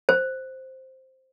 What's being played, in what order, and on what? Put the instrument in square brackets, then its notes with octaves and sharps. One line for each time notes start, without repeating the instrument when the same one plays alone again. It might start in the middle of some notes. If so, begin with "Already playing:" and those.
[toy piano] C5